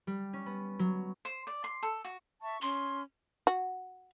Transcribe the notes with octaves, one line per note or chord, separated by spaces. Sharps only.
G3
C#4
B3
F#3
C5
D5
C6
A4
F#4
E5 A5 C#6
C#4 C6
F#4